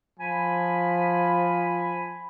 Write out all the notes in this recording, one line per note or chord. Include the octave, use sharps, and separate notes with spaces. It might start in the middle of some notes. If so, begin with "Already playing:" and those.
F3 G#5 B5